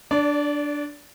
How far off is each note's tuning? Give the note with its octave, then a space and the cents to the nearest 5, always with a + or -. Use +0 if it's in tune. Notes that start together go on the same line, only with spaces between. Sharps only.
D4 +0 D5 -30